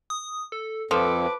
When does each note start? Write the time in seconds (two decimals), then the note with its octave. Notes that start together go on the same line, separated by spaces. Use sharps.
0.10 D#6
0.52 A4
0.91 F2 F3 A4 B4 D6